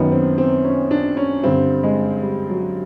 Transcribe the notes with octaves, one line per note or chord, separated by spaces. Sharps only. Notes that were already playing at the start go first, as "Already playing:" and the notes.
Already playing: F#2 D#3 B3
C4
C4
C#4
D4
C#4
G2 D3 C4
G#3
G3
F#3